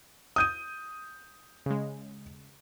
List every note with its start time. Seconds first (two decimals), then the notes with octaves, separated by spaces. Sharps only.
0.36 D#6 G6 D#7
1.66 C#3 G#3